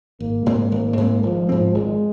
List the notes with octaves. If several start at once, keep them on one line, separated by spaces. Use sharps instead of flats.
G#1 A#3
G#2 G#3 C4
G#1 A#3
G#2 G#3 C4
G#1 F3
G#2 G#3 C4
G#1 G#3